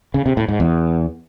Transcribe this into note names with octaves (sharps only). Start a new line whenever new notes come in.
C#3
C3
A2
G#2
E2